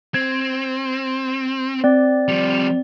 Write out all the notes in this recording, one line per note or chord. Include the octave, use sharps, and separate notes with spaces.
C4 G#6
C4 D5
F3 G3